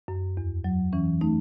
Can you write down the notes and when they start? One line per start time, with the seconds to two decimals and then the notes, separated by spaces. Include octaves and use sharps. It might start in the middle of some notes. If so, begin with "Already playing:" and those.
0.08 F#2
0.37 E2
0.64 F#3
0.93 E3 C#4
1.21 A3 D#4